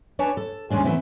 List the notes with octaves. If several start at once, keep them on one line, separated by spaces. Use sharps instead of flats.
D4 B4 C#5 G#5 A5
A4
D#2 G#3 C#4 D4 G#4
E3 A3 B3 C4 E4